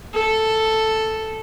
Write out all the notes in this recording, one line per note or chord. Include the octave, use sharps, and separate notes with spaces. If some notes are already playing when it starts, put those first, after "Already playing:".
A4